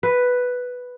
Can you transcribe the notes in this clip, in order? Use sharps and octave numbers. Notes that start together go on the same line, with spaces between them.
B4